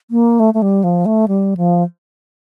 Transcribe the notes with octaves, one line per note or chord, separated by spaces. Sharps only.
A#3
A3
A3
G3
F3
A3
G3
F3